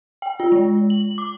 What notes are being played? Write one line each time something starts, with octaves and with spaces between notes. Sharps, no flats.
G5
F4
G#3
F#7
D6